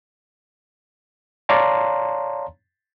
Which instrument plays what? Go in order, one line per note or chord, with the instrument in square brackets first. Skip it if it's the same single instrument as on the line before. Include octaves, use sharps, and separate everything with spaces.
[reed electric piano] C#5 D5 F5 A5 A#5 C6